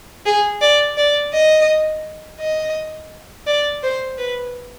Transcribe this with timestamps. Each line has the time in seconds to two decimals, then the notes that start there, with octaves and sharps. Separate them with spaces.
0.26 G#4
0.62 D5
0.98 D5
1.33 D#5
2.40 D#5
3.47 D5
3.83 C5
4.18 B4